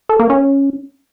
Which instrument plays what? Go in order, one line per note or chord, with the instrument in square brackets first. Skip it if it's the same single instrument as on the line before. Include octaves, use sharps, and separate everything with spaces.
[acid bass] A4
A#3
C#4